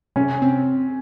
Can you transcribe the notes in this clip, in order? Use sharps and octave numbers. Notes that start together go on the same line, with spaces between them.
C3 C#4
C4